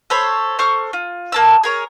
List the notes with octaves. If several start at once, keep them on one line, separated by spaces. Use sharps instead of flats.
A4 C5 C#5 B5
A4 C5 C#6 F6
F4
A#3 A5 E6
G#4 A#4 C#5